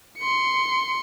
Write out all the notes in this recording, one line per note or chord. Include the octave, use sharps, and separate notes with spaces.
C6 C#7